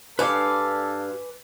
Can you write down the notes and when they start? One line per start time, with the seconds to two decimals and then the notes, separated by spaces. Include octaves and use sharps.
0.19 G2 A4 B4 F5 G#5 D6